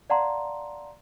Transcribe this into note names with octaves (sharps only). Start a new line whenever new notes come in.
D5 F5 F#5 A5 A#5 C6